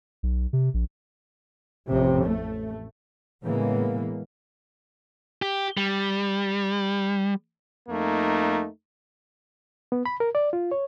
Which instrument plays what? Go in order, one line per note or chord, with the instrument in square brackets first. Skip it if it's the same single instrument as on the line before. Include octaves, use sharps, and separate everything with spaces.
[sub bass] B1
C3
A#1
[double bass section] A1 F2 C3
A3
A2 C#3 E3 G#3 A#3 B3
[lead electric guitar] G4
G3
[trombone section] F2 A3 A#3 D#4
[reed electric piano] B3
B5
A#4
D5
F4
C#5